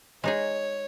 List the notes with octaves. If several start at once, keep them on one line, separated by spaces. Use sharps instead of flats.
G#3 D#4 G#4 C#5